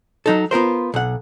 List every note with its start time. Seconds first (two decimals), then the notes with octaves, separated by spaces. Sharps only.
0.26 F#3 D#4 A4
0.51 B3 F4 A#4 C5
0.94 B1 F#5